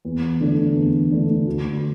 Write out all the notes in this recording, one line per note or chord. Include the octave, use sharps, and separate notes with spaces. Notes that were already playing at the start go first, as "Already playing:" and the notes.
E2
D3 A3 D4
E2
D3 A3 D4
D2